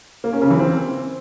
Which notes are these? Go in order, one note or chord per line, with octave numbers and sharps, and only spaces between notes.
A#3
C#4
C#3
E3
C4